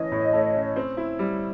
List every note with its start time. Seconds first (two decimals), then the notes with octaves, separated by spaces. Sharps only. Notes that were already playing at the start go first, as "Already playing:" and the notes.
Already playing: E3 A3 C#4 C#5 D#5
0.12 A2
0.33 A3
0.55 C#4
0.76 C4
0.97 E4
1.19 G3